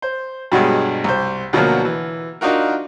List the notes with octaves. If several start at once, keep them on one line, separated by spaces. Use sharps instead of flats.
C5
G2 B2 F#3 G#3
C2 C5
D2 B2 F3 F#3 A#3
E3
D4 D#4 F4 F#4 A#4